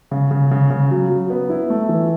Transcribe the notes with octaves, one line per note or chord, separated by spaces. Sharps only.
C#3
C#3
C#3
C#3
F#3
F#3
B3
E4
A3
E3